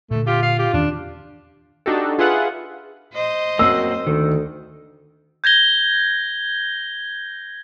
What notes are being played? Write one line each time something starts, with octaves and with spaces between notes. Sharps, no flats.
A#2 D3 A3
F4 G4
F5
G4
E2 D#3 C#4 D4
D4 D#4 F#4 G4 A4
F4 G#4 B4 E5 F#5
C5 D#5
F#2 A#3 C4 F#4 E6
D2 D#3
G6 G#6 A#6 G7